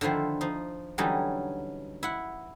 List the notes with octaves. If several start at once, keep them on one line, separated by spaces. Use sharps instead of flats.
D3 D#3 F3 E4 C5
F3 D#4
D3 E3 F#3 G3 C#4 D#4
E4 F#5